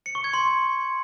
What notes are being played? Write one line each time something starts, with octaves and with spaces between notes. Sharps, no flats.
C#7
C#6
G#6
C6